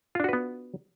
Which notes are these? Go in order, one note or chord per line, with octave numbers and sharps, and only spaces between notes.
B3 D4 F4 F#4 B4